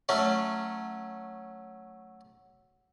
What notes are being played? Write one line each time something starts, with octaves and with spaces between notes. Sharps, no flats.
F#3 A3 C#4